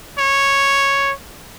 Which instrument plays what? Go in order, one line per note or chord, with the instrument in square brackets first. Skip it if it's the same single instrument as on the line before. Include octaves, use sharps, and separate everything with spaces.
[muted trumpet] C#5